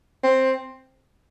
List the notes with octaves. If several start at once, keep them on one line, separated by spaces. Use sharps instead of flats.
C4